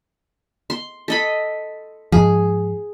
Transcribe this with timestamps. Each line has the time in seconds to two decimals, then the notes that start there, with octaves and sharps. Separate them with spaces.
0.70 C6
1.08 A4 D#5 B5
2.12 G#2 F3 G#4